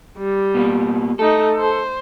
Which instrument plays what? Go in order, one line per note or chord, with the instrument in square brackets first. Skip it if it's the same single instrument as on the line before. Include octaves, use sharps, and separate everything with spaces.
[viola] G3
[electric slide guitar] B2 A#3
[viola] A3 D#4 [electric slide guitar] A4
[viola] C5